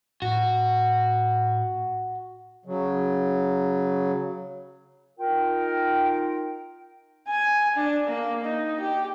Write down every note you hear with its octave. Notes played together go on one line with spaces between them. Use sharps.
A2 F#4
C#3 F#3
D#4 F4 A#4 G5
G#5
D4
A#3
D#4
G4